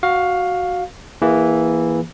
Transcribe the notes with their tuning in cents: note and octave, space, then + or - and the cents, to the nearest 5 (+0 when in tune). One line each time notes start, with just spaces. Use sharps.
F#4 +0 F5 +15
E3 +0 A#3 +15 G#4 -15